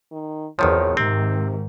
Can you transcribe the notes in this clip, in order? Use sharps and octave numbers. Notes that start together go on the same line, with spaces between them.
D#3
G#1 E2 D#3 F3 C#5
G#2 C3 D#3 C4